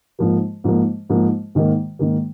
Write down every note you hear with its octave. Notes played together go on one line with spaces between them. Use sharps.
G#2 F3 A#3
G#2 F3 A#3
G#2 F3 A#3
G#2 D#3 A#3
G#2 D#3 A#3